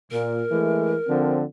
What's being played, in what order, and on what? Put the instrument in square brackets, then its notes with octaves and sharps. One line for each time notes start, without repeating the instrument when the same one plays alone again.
[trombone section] A#2 [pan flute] A#4
[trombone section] E3 G#3 A3
D3 F3 C4